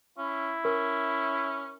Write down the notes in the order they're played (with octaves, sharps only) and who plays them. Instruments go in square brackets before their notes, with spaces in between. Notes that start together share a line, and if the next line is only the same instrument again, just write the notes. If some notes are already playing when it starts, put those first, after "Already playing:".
[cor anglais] C#4 [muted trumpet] E4
[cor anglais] C#4 [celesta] A#4